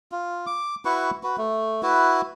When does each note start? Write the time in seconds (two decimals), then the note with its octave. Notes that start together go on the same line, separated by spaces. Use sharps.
0.12 F4
0.47 D6
0.85 E4 F#4 B4 C#6
1.23 F#4 B4
1.38 A3
1.83 E4 F#4 B4